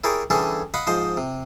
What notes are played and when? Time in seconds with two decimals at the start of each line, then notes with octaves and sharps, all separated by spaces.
0.04 E4 G4 G#4 A#4 C#5 D5
0.30 D3 E3 G3 C#4 G#4 A4
0.74 D#5 F5 F#5 B5
0.87 G#2 F3 C5 D#5 C6
1.17 C3